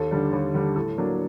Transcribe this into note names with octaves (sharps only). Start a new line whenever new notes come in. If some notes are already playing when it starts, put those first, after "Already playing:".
Already playing: D#2 A4
D3 G3 D4
D#2
D3 G3 D4
A2 A4
F#3 A#3 D4